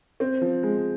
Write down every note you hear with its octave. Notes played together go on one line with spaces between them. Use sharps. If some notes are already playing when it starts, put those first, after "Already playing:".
C4
F3
G#3